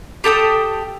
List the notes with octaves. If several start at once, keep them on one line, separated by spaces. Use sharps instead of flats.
G4 A4 G5 D#6